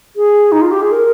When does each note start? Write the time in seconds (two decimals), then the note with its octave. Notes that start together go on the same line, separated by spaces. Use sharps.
0.16 G#4
0.52 D#4
0.62 F4
0.71 G4
0.82 G#4
0.92 A#4